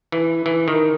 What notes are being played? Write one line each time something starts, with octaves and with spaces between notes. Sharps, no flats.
E3
E3
D#3